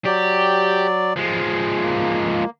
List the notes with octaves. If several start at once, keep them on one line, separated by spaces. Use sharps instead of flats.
F#3 G4 D5
F3 G#3
A#3